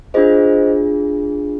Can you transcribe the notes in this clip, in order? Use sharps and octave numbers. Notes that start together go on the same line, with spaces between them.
D4 F4 G#4 C5 D#5